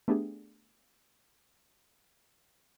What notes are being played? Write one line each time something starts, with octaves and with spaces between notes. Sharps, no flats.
A3 B3 D4 G4 G#4